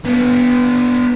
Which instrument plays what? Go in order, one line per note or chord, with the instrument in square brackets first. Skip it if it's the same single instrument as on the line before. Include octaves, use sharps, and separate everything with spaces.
[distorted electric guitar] B3 D4